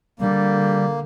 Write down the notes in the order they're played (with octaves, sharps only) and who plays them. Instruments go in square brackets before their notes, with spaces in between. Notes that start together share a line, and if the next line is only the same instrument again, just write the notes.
[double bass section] D3 [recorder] G3 [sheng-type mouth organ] A#3